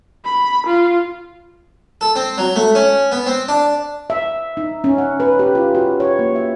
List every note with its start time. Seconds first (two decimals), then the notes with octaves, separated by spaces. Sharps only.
0.25 B5
0.66 F4
2.01 A4
2.16 C4
2.38 F#3
2.56 A3
2.75 C#4
3.12 B3
3.26 C4
3.49 D4
4.10 E5
4.57 D#4
4.84 C#4
4.98 F#5
5.20 B4
5.39 G4
5.55 F4
5.75 F#4
6.00 C#5
6.19 A#3
6.35 E5